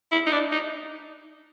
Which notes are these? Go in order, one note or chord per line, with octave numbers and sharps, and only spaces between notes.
E4
D#4
D4
D#4